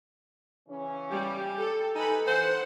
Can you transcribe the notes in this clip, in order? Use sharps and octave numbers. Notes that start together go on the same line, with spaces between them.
C#3 E3 C#4
G3 G4
A4
D#4 A4 B4 G#5 B5
E3 C5 F#5